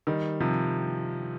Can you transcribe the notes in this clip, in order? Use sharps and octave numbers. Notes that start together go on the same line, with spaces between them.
D#3 G3
C3 F3